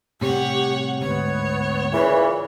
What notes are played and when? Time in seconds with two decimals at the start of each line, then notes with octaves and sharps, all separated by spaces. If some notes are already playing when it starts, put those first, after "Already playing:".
0.21 A2 C3 G3 G4 C#5 F#5
1.01 D2 G#2 B3 C#5
1.92 A#2 C#3 E3 B4